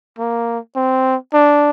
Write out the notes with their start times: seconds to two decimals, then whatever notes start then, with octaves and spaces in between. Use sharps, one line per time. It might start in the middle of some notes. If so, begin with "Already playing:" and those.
0.19 A#3
0.76 C4
1.34 D4